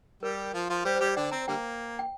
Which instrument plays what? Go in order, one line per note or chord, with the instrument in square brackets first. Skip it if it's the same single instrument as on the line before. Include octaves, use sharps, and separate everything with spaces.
[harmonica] G3 G4 [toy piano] A#4
[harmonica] F3 F4
F3 F4
[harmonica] G3 G4 [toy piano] C5
[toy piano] C5
[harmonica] G3 G4
[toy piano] D5
[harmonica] D3 D4 [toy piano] G5
[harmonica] C4 [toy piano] A#5
[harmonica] D3 G3 A#3 [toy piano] G5
[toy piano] G5